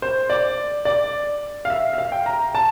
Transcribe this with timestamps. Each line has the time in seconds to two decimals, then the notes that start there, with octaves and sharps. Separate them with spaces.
0.02 C5
0.30 D5
0.85 D5
1.65 F5
1.70 E5
1.93 E5
1.98 F5
2.12 G5
2.26 A#5
2.55 A5